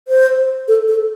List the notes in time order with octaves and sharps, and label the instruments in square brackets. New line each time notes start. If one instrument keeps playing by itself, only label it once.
[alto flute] C5
A4
A4